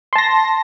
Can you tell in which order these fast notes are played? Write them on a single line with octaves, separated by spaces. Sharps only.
C6 A5 A#6